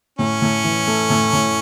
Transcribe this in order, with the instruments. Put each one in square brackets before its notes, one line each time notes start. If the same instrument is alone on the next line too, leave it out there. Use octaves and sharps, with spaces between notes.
[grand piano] A2 [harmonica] C#4
[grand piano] A2
E3
A3
A2
A2